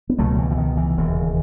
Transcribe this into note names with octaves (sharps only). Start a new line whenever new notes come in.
B3
C#2 B2 F#3 A3
E3
E3
D#3
E3
E1 D#2 C#3